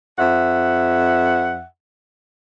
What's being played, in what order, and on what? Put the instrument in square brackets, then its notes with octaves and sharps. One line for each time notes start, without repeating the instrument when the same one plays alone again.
[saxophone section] F2 E5 F#5